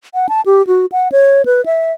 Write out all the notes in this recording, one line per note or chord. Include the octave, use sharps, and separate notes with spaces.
F#5
A5
G4
F#4
F#5
C#5
B4
E5